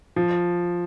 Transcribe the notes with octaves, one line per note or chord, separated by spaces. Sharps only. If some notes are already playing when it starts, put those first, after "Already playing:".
F3